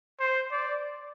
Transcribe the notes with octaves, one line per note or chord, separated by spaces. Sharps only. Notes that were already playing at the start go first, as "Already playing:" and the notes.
C5
D5